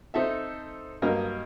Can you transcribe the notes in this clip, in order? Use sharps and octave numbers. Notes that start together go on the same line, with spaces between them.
C4 D#4 A4 E5
G2 F#3 A#3 A#4 D#5